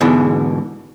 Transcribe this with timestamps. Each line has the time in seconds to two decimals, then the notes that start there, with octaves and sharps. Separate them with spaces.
0.01 G#2 B2 D3 E3